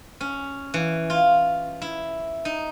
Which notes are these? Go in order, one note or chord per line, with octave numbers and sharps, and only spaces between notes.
C#4
E3
F4
E4
D#4